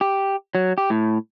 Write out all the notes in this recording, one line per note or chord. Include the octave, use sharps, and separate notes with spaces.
G4
F#3
G4
A2